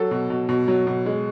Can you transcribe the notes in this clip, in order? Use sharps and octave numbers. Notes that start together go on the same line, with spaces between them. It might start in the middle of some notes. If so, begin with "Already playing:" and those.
Already playing: F#3 A4
B2
B2
B2
F#3
B2
G#3